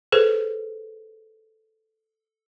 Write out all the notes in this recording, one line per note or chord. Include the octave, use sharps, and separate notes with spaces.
G#4 A4 B4 C5